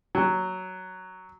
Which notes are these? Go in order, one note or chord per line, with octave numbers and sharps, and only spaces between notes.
F#3